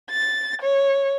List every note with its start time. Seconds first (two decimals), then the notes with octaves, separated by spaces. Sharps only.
0.10 A6
0.62 C#5